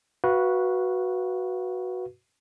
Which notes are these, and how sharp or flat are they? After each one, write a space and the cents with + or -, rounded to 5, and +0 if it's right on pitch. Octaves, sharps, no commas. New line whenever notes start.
F#4 +0 B4 -15 F5 -25